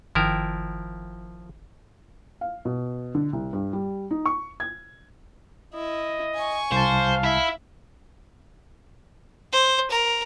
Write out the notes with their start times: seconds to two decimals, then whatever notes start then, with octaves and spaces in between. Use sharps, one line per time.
0.15 G1 D#3 F3 E4 A#4 G5
2.41 F5
2.65 B2
3.15 D3
3.33 C2
3.53 G2
3.73 G3
4.11 D#4
4.26 C#6
4.60 G#6
5.74 E4 D#5
6.36 G#5 C#6
6.72 C2 C5 F5 A5
7.24 E4 E5
9.52 C5
9.91 A#4